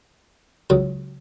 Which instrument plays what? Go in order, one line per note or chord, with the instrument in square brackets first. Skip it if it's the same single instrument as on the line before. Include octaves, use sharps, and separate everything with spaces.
[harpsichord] C#2 C#3 F#3